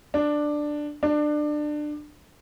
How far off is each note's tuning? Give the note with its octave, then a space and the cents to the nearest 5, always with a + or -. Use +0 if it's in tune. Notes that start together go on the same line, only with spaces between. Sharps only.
D4 +10
D4 +25